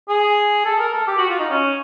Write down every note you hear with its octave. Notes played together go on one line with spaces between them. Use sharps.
G#4
A4
A#4
A4
G4
F#4
F4
D#4
C#4